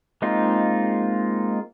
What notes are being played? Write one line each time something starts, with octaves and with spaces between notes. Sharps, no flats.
G#3 A#3 C4 D#4 F4